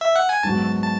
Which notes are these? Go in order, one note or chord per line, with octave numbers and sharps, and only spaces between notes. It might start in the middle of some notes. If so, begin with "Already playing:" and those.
E5
F#5
G#5
G#2 D#3 F#3 B3 F#4 A5
A5